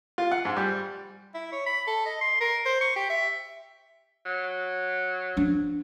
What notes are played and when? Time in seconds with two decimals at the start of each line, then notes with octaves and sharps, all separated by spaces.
0.18 F4
0.32 F#5
0.45 G#2
0.57 G3
1.34 E4
1.52 C#5
1.67 B5
1.87 A4
2.06 D#5
2.21 C6
2.41 A#4
2.66 C5
2.81 C#6
2.96 G4
3.10 E5
4.26 F#3
5.37 F3 D4